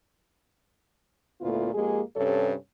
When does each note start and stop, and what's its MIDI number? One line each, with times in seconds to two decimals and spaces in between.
1.41 1.73 38
1.41 1.73 46
1.41 1.73 57
1.41 1.73 59
1.41 1.73 64
1.41 1.73 65
1.74 2.00 41
1.74 2.00 56
1.74 2.00 58
1.74 2.00 67
1.74 2.00 68
2.16 2.53 43
2.16 2.53 48
2.16 2.53 61
2.16 2.53 69
2.16 2.53 73